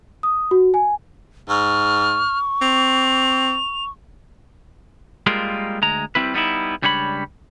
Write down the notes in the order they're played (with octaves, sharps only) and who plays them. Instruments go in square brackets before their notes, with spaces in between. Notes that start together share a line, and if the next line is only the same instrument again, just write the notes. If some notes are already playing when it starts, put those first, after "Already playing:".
[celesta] D#6
F#4
G#5
[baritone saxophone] G#2 [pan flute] C#6 [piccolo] F6
[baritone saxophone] C4 [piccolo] F7
[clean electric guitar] G3 G#3 A#3 F4 A#4
D2 G#3 A#5
G3 C4 E4 B4
G3 B3 D#4 E4
C#2 G3 D4 C#5 F5 B5